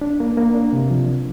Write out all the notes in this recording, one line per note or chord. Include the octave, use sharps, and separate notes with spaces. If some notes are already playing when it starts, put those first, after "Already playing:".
D4
A#3
A#3
D4
C3
F3